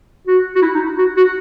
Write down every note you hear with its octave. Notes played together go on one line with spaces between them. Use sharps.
F#4
F#4
E4
D#4
F#4
F#4